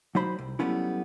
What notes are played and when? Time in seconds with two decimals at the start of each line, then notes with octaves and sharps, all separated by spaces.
0.15 F#3 D#4 C5 B5
0.38 C2
0.59 F#3 G3 A3 B3 C#4 E4